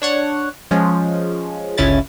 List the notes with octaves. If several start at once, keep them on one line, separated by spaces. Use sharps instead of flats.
D4 C#5 F#5
F3 G#3 C#4
G1 C#2 C#3 C#4 E4 A6